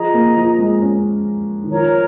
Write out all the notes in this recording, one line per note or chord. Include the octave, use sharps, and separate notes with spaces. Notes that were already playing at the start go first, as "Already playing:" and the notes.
Already playing: F3 G#4 D#5 A#5
A#3
F3
G#3
C#4
D#3
F3 A#4 C#5 A#5